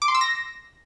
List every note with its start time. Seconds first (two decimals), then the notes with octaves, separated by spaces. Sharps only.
0.02 D6
0.08 C6
0.15 E6
0.21 A#6